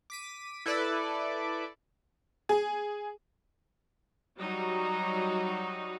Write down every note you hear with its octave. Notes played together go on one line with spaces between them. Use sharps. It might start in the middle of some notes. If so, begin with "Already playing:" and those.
D6 B6 D#7
E4 A4 B4 D5 D6
G#4
F#3 G3 D#4 F#4